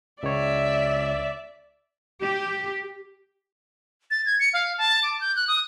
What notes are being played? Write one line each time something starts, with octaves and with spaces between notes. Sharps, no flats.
C#2 C#5 D5 E5
G4
A6
G#6
C#7
F5
A5
D6
G6
F#6
D#6